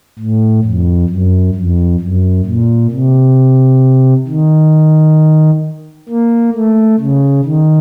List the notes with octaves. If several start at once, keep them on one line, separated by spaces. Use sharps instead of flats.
A2
F2
F#2
F2
F#2
A#2
C3
D#3
A#3
A3
C#3
D#3